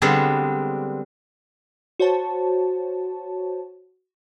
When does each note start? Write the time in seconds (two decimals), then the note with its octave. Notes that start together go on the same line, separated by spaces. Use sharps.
0.02 D3 G3 G#3 B3 C4 D4
1.99 F#4 C5 C#5 A5